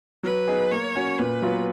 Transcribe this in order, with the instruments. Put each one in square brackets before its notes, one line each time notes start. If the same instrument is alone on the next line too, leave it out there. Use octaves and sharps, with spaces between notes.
[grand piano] F#3 [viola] B4
[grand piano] B3 D#4 G#4
[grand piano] A#3 [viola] C#5
[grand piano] C#4 F#4
[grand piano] A#2 [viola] B4
[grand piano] F#3 B3 F4